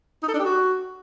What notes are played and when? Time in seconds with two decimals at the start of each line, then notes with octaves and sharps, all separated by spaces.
0.23 D#4
0.28 A4
0.34 D4
0.39 G4
0.45 F#4